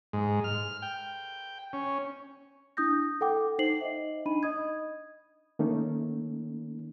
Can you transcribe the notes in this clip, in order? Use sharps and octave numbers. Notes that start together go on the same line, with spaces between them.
G#2
F6
G5
C#4
D4 E4 D#6 G6 A#6
A4 F#5 G5 D6
D#4 C5 C7 F#7
D#5 E5
D4 D#4 B5 D#7
D#5 D#6 G#6
D#3 A3 A#3 C#4 D#4